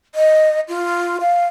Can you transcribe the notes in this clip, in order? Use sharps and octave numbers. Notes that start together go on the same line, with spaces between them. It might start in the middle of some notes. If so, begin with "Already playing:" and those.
D#5
F4
F5